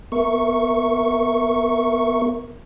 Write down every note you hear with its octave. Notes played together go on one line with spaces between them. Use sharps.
B3 A#4 E5 C#6